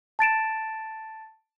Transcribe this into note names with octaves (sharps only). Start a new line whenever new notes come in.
A5 A6 D7 E7